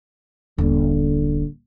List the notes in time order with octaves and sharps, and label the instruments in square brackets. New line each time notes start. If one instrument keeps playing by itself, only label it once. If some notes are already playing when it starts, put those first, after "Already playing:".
[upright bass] D#1 A1 [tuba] D3